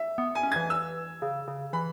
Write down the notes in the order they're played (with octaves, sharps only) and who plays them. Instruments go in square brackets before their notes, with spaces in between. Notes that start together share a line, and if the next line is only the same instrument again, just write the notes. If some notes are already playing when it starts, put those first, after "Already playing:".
Already playing: [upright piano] E5
[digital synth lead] B3
[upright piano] G#5
[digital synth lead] C#4
[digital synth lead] E3 [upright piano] G#6
[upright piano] E6
[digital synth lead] C#3
C#3
[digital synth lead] E3 [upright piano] B5